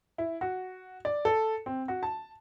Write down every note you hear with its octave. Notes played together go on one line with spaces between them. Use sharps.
E4
F#4
D5
A4
C4
F#4
A5